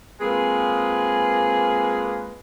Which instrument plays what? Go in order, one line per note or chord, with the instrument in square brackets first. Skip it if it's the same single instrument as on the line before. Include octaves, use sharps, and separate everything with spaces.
[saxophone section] F3 G#3 A#3 C4 G#4 B4